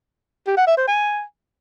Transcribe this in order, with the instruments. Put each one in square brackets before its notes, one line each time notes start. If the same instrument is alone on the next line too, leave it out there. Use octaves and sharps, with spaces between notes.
[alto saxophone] G4
F#5
E5
C5
G#5